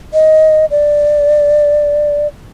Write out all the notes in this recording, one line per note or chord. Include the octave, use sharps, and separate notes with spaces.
D#5
D5